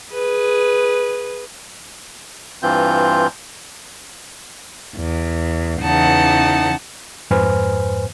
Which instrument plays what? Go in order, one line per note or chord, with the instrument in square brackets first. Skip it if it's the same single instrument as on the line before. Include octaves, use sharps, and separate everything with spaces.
[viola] G#4 B4
[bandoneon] G2 E3 C4 F4 G6
[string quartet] E2
E2 C#3 E3 D#4 F#5 A5
[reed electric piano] F2 G#2 B4 C5 G#5 F6